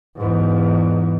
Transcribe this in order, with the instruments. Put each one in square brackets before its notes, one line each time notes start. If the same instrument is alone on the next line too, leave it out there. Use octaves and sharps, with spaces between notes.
[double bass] E2 G#2